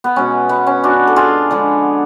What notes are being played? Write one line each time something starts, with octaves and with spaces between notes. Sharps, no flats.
B3
B2 G#3 C#4
B3
C#4
D4 F#4
A4
F4 G#4
D3 F3 G#3